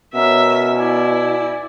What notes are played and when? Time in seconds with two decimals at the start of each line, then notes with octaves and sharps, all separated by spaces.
0.15 B2 C#4 A#4 E5
0.78 E4 D5 G#5